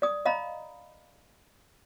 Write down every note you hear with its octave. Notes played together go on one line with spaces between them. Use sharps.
D5 D#6
D#5 F5 A#5 B5